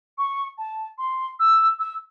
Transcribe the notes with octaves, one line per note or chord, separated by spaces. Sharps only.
C#6
A5
C6
E6
E6